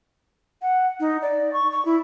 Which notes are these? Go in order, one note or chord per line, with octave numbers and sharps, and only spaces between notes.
F#5
D#4
D5
C#6
C#6
E4